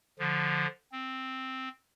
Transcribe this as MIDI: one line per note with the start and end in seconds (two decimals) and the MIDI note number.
0.19 0.66 50
0.19 0.66 53
0.92 1.69 60